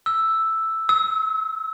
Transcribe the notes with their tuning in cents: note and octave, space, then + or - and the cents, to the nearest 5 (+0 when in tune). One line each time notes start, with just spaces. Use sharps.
E6 +0
E6 -35